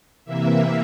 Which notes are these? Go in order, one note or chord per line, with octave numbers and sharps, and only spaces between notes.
C3 E3 A#3 E5